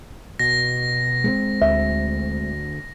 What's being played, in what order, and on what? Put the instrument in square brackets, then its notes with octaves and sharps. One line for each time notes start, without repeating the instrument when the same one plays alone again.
[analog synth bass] B2 [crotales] A#6
[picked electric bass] G#3 A#3 C4
[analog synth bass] D2 [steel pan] E5